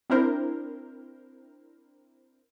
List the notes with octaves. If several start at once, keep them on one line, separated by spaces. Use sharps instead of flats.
C4 D4 E4 A#4 C5